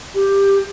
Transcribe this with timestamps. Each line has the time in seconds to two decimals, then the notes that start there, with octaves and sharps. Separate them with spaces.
0.15 G4